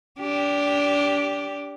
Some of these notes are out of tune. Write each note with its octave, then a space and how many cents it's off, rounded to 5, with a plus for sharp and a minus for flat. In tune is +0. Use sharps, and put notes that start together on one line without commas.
D4 -25 G4 +0